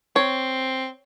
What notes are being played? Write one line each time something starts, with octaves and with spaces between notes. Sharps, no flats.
C4 C#5